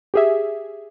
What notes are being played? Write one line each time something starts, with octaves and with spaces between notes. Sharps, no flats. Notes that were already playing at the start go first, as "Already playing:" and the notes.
G4 G#4 E5